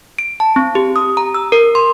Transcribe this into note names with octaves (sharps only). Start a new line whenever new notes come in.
D7
A5
C4
G4
D#6
A#5
E6
A#4
C6